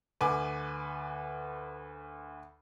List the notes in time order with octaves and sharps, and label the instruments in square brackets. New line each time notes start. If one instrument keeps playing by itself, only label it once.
[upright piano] D2 B4 G#5 D6